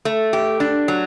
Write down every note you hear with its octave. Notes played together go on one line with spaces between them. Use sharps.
A3
G4
D4
F#3